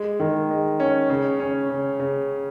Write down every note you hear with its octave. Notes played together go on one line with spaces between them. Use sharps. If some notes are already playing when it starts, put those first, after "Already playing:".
Already playing: G#3
D#3
G#3
C#4
C#3
C#4
C#3
C#3